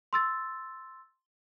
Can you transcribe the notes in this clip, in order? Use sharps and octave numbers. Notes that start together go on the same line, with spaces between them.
C6 E6 A6